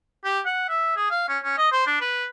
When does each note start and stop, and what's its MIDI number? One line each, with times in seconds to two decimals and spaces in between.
0.25 0.40 67
0.45 0.64 78
0.69 0.92 76
0.96 1.10 68
1.10 1.24 77
1.29 1.38 61
1.43 1.56 61
1.57 1.67 75
1.72 1.87 72
1.87 2.00 62
2.01 2.25 71